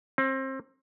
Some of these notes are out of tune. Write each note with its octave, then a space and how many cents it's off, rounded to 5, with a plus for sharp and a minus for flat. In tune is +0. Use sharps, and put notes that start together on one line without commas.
C4 +30